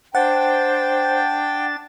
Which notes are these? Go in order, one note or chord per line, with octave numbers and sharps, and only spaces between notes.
D4 C5 F#5 G5 A6